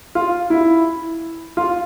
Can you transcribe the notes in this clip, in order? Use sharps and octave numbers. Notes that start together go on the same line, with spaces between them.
F4
E4
F4